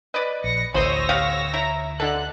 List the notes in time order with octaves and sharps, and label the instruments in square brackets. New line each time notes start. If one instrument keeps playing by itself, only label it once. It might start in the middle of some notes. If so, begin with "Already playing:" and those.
[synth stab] B4 [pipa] D5 D#5
[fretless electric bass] A#1 [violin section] A#6 C#7
[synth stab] A1 C5 D#6 [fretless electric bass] D2 [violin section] C#5 E6 A#6 [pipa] B5
[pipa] B3 G4 F5
[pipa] E4 [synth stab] A#5
[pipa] B2 [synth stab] D3 A4 [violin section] F#6